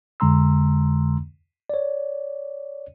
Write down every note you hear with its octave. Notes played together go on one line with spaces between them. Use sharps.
F2 D3 G#3 A#5 C6 E6
C#5 D5